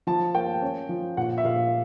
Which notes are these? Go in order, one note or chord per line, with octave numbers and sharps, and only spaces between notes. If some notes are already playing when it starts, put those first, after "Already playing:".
F3 A5
A#3 G5
C#4
F3
A#2 F#5
E5
A#2 F5